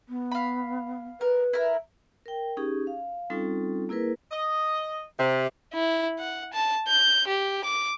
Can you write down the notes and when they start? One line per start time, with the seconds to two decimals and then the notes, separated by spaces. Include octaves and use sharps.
0.09 B3
0.31 F5 B5
1.21 A#4 B4
1.53 E4 A#4
2.26 A#4 G5
2.57 C#4 D#4 G4 G#4
2.87 F5
3.30 G3 C4 C#4 D#4 F4 A4
3.89 A#3 E4 G#4 A#4 B4
4.30 D#5
5.17 C3
5.74 E4
6.19 F#5
6.53 A5
6.88 G6
7.27 G4
7.64 D6